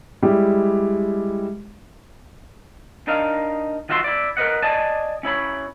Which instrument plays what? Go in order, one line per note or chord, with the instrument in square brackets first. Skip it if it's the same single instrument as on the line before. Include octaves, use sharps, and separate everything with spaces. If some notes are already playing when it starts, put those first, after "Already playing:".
[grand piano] G3 G#3 E4 G4
[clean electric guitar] D4 D#4 A#4 D#5 F5
D#3 F4 F#4 E5 G5 C6
E4 D5
A#4 B4 D#5 F#5
D5 D#5 G#5 A5
C#4 E4 C#5 B5